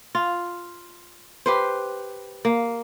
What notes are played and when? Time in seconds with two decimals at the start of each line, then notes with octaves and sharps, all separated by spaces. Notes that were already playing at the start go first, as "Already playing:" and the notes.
0.15 F4
1.46 G4 B4 C5
2.45 A#3